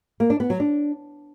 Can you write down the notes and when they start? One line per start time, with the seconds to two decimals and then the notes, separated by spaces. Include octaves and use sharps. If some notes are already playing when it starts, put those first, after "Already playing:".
0.20 A#3
0.30 D4
0.40 B3
0.50 F#3
0.60 D4